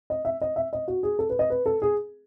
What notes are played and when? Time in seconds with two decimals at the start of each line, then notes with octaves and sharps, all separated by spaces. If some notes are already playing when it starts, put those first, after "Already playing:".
0.10 D#5
0.25 E5
0.41 D#5
0.56 E5
0.73 D#5
0.88 F#4
1.03 G#4
1.19 A4
1.30 B4
1.39 D#5
1.50 B4
1.66 A4
1.82 G#4